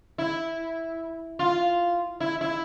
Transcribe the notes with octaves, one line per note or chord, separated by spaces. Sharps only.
E4
F4
E4
E4